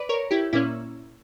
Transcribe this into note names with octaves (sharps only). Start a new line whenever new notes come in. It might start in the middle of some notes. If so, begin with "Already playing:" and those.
Already playing: B4 D5
A#4 C#5
E4 G4
A#2 A#3 C#4 E4